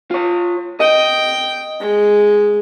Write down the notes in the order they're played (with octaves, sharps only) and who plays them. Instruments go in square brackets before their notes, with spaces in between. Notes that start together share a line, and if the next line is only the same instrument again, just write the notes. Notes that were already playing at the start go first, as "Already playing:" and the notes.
[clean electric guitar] F4 C#5
[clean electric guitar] D#5 [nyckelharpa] G5
[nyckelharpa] G#3